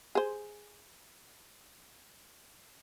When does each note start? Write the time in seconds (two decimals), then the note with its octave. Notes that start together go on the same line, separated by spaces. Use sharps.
0.15 G#4 C5